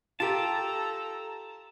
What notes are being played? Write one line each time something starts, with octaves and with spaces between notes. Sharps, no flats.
F4 G4 A4 A5 A#5